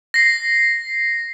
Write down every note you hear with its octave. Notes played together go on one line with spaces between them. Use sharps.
A#6 C7